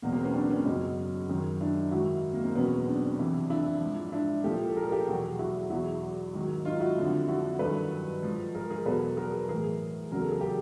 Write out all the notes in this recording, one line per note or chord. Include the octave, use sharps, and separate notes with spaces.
E2 B2 F#3 A#3
A#3 C4
B3 C#4
C4 D4
B3 C#4
F#2 C#3 F#3 C#4 D#4
F#2 D#3 F#3
D4 E4
G#2 D#3 F#3 E4 F#4
A#3
A#3 C4
E2 B2 F#3 B3 C#4
C4 D4
F2 C3 E3
D4 E4
G#2 F3
D4 E4
A#2 F3 G4 A4
A4
G#4 A#4
G4 A4
E2 B2 F#3 F#4 G#4
E4 F#4
E2 B2 F#3 E4 F#4
G#2 D#3 F#3
D#4 F4
E4 F#4
F2 D3 F3
E4 F#4
G2 D#3 F#3 A4 B4
G#2 F3
G#4 A#4
G#4 A#4
E2 B2 F#3 A4 B4
G#4 A#4
A2 E3 G#4 A#4
E2 C#3 F#3 A#4
A4
G#4
G4 A4